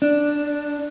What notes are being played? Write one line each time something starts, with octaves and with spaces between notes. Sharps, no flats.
D4